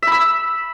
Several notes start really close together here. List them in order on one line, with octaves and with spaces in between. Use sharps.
E5 B5 E6